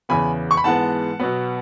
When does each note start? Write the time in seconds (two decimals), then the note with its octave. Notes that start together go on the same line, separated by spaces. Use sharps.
0.09 E2 C#3 E3 B3 G#5 B5
0.51 C#6
0.57 B5
0.64 G#2 E3 G#3 B3 F#5 A5
1.20 B2 F#3 B3